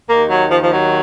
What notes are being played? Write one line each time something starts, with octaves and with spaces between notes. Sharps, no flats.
D#2 D#3 A#3
F#3
F3
F3
F#3